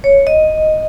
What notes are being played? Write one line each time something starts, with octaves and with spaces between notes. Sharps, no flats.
C#5
D#5